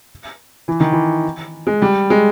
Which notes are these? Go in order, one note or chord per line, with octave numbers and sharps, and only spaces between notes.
E3
D#3
E3
G#3
G3
G#3